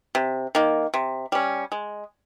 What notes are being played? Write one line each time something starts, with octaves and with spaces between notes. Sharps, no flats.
C3
D#3 A#3
C3
G3 C#4
G#3